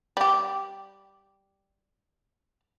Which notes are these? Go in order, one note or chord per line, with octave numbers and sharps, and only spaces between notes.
G3 G4